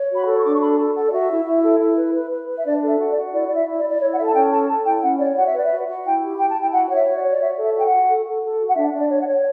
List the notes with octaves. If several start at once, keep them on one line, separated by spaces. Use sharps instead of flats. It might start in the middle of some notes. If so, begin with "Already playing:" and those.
Already playing: C#5
F#4
B5
A4
C#6
D4 D6
C#6
A4 B5
A4 A5
A4 F#5
D5
F#4 E5
E4
E4
A4
E4
B4
B4
B4
B4
E5
D4 D5
A4
E5
F#4
D5
F#4
E4 D5
E4 D5
E5
E4
D5
E4
D5
E4 C#5
F#5
A4 E5
A5
C#4 G5
A4 A5
A4 A5
E4 G5
C#4 F#5
C#5 D5
F#4 F#5
E5
B4 D5
F#4 E5
F#4
E4 G5
G4
E4 G5
A5
E4 G5
F#4 F#5
C#5 F#5
E5
F#4
D5
C#5
D5
F#4 E5
A4
E5
F#4 G5
F#5
F#4
A4
A4
A4
F#4
F#5
D4 E5
D4
D5
C#5
F#5
C#5